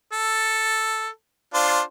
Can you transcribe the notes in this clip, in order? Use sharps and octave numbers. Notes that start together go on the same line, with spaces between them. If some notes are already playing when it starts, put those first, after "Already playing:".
A4
D4 F4 C5